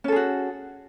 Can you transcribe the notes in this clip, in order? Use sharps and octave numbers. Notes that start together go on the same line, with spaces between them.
C#4 F#4 G#4 A4